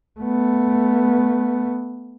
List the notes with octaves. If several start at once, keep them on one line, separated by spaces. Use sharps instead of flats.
A3 B3